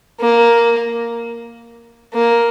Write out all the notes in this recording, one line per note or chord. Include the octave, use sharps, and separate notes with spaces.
A#3
A#3